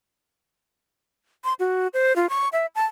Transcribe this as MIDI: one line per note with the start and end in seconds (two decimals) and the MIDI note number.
1.44 1.54 84
1.60 1.87 66
1.94 2.16 72
2.16 2.29 65
2.30 2.49 85
2.53 2.66 76
2.75 2.85 81